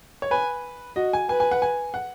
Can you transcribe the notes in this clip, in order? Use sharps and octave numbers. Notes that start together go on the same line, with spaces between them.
C#5
B4 G#5
F#4 D#5
G#5
B4 G#5
G#5
F#5
G#5
F#5